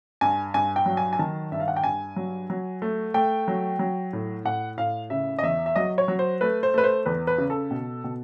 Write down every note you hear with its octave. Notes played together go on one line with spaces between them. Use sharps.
G2 G#5
G2 G#5
G5
F#3
G#5
G#5
D#3 A5
G2 E5
F5
F#5
G5
G2 G#5
F#3
F#3
A3
A3 G5
F#3
F#3
A2
A2 F#5
A2 F5
C#3 E5
D#5
E2 E5
E5
F#3 D#5
C#5
F#3
C5
A3 B4
C5
A3 B4
C5
E2 B4
B4
C#3
A4
B2
B2